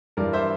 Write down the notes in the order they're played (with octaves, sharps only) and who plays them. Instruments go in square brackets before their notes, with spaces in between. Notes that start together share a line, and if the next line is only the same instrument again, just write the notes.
[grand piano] G2 E3 G3 A#4 D5
C5 E5